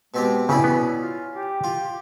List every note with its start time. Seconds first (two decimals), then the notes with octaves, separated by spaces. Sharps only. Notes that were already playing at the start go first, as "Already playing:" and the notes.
0.14 B2 G#3 C4 G4
0.49 C#3 C4 C#4 E4 D5
0.64 B2 B3
1.00 F4
1.34 G4
1.64 F4